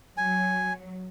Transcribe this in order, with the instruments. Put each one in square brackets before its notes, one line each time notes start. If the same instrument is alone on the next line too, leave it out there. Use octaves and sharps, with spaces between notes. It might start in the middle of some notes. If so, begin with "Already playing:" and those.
[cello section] F#3 [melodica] G#5